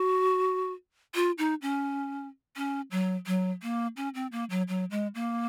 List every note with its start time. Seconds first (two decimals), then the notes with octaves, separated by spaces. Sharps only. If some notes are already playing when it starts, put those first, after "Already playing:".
Already playing: F#4
1.15 F4
1.38 D#4
1.62 C#4
2.56 C#4
2.91 F#3
3.26 F#3
3.63 A#3
3.97 C#4
4.14 C4
4.32 A#3
4.50 F#3
4.68 F#3
4.91 G#3
5.15 A#3